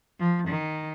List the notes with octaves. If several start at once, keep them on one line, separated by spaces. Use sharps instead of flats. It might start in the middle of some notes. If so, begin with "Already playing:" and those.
F3
D#3